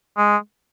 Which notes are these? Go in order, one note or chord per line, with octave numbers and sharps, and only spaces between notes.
G#3